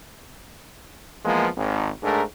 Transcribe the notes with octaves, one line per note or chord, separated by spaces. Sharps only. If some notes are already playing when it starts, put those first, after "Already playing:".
E3 F3 G#3 A#3 B3
G#1
G#2 A3 D4 G#4 A#4